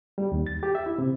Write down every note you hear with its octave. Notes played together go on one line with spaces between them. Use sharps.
G3
D#2
A6
G4
E5
E4
C3